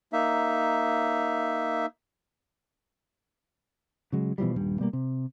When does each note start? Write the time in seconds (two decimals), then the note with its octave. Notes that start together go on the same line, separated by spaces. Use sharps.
0.13 A#3 D#4 E5
4.12 C#3 F#3 G#3
4.38 B2 E3 F3 G3
4.56 D#1 G2 G3
4.79 B2 G3 A#3
4.93 C3